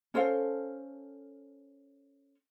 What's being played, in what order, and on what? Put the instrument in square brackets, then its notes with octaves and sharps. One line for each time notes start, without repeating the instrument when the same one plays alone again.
[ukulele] C#4 A4 C5 F5